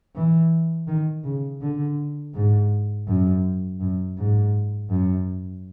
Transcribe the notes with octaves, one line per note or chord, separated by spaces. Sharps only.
E3
D#3
C#3
D3
G#2
F#2
F#2
G#2
F#2